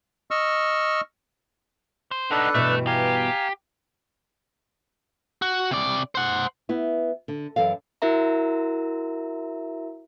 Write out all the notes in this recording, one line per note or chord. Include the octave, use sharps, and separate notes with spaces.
D#5 C#6 E6 F6
C5
B3 D4 D#4 A4 B4
G2 B2 E3 A3
G4 F5 G#5 A#5
F#4
C3 D5
C5 F#5
B3 E4
D3
F#2 E3 A4 F5
E4 F#4 A#4 E5 A#5